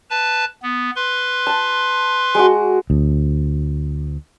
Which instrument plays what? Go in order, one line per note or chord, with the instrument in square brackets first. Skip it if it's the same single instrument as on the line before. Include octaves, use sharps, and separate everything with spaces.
[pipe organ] B4 A5
B3
B4 C6
[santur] A5
G#3 F#4
[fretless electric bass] D2